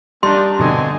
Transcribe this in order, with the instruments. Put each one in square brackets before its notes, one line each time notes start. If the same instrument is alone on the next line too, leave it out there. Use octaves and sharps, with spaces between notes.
[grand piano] G3 [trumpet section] A#3 D4 D#4 [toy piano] C6
[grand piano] G2 B2 D3 [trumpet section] C4 D#5 G#5